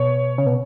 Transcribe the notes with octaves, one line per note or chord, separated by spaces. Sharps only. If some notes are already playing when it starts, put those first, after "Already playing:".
Already playing: B2 C#5
C#3
B2